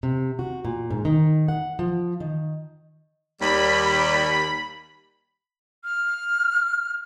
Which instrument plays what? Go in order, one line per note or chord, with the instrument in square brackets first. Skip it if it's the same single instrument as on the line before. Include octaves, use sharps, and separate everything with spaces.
[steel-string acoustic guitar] C3
F#4
A#2
G#2
D#3
F#5
F3
D#3
[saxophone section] D#2 G3 [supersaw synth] B5
[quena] F6